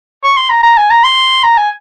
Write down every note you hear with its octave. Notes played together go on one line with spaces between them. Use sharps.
C#6
C6
A#5
A#5
G#5
A#5
C6
A#5
G#5